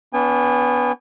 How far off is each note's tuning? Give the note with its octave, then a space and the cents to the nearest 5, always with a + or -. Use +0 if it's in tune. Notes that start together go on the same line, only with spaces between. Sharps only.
B3 +0 D4 -45 G#5 -40